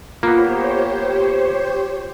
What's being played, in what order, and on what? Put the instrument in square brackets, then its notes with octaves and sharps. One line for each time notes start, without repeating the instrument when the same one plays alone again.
[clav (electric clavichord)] A#3 B3 [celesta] F4 [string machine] G4 C5 C#5